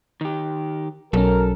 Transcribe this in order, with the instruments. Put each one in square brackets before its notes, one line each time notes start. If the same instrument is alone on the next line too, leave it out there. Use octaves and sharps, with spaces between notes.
[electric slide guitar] D#3 G4
[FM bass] B1 [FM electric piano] F#3 C#4 [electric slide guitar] A4 [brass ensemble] A#4